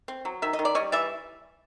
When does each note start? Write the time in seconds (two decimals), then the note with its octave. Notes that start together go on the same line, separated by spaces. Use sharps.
0.08 C4
0.25 F#3
0.42 D#3 E5
0.53 D#5
0.59 D#3
0.65 D5
0.75 G3 C#5 D#5
0.92 E3 D5 E5